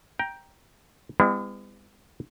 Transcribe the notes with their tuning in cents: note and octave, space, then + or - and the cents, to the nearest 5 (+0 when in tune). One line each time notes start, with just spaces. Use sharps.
G5 +0 A#5 +15
G#3 -45 B3 +40 E4 +25